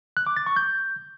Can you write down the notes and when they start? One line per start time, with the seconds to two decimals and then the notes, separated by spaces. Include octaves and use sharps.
0.17 F#6
0.27 D6
0.37 A6
0.46 C#6
0.56 G6